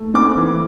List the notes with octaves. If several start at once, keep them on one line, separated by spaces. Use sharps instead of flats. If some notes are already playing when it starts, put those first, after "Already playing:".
Already playing: A3
C4 D6
E3